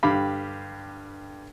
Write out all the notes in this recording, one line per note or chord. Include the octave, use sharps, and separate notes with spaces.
G2 D3 G4 F5 B5 D6